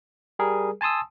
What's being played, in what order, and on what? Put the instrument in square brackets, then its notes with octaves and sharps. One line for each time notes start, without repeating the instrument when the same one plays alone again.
[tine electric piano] G3 G#4 A#4
G#5 A5 C6 D#6 E6